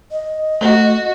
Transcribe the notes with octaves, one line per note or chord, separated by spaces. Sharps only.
D#5
A3 F#4